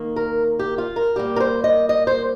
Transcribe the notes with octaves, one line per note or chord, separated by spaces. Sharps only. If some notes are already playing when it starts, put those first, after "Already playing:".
Already playing: D#3 A#3
A#4
G4
F4
A#4
A#2 G3 A#3 G4
A#4
C5
D#5
D#5
C5